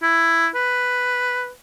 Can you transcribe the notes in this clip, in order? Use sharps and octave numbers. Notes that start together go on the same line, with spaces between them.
E4
B4